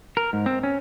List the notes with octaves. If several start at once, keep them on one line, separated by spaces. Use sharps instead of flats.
A#4
G#2
C4
C#4